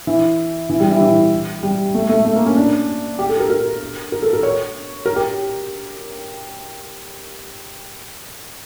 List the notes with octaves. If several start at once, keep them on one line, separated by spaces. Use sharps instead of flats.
E3
E3
G3
E3
E3
G3
A3
A3
A3
A#3
C#4
D4
G4
A4
A#4
A#4
A#4
A4
A#4
C#5
A#4
G4